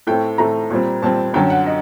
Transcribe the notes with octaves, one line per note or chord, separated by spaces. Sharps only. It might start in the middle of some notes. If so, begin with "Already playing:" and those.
A2 A3 C4 G5
A2 A3 C4 A#5
A#2 G3 C4
A#2 G3 C4 A5
F#2 D3 F#3 G5
F#5
D#5